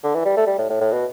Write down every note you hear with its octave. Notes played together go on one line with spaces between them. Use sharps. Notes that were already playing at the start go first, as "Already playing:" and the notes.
D3
E3
G3
A3
G3
A2
A2
A2
B2